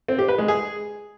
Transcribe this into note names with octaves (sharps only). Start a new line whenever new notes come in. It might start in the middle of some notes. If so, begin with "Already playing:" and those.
C4
G4
B4
G#3
G#4